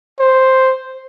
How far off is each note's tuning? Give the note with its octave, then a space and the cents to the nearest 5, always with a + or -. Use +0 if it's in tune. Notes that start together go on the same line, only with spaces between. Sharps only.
C5 +0